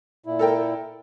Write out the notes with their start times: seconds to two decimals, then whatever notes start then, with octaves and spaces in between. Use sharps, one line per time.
0.26 A#2 E4
0.39 A4 A#4 G5